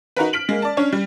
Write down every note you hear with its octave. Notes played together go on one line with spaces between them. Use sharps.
D#4 F#4 A#4 B4
F6 B6 D7 F#7
G#3 A#3
D5 A5
C#4 D4 C#5
G3